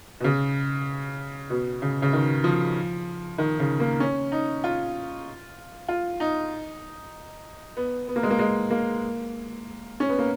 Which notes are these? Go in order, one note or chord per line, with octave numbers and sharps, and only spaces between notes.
B2
C#3
B2
C#3
C#3
D#3
F3
D#3
C#3
A#3
C#4
D#4
F4
F4
D#4
B3
B3
A#3
G#3
A#3
G#3
A#3
C#4
B3
A#3